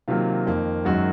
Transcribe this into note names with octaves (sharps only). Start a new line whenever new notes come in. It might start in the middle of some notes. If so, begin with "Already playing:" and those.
C3 D#3 F#3 A#3 F4
F2 D#3 A#3
F#2 D#3 F#3 G#3 F#4